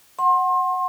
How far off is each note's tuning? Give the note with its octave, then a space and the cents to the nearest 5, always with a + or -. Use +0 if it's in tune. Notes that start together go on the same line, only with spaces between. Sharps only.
F#5 +0 C6 +30